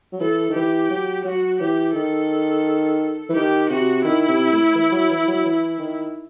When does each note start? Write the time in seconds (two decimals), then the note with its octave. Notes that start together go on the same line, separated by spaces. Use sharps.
0.12 F#3
0.20 E3 A4
0.50 D#3
0.55 E3 G4
0.90 F#3
1.25 F#3 F#4
1.60 E3 G4
1.95 D#3 A4
3.29 E3
3.35 D#3 G4
3.70 C3 F#4
4.04 D#3 E4
4.28 C3
4.52 A2
4.75 E3
4.92 F#3
5.10 E3
5.28 F#3
5.45 E3
5.79 D#3